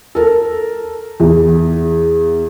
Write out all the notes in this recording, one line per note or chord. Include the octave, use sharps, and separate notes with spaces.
A4 A#4
E2